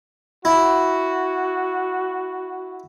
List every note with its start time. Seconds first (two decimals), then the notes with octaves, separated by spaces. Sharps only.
0.45 E4 F#4